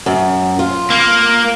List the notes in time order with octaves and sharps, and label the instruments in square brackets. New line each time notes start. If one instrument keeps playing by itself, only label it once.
[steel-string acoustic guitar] F#2
F4
[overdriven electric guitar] A#3